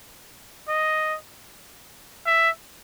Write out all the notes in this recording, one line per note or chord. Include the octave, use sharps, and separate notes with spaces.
D#5
E5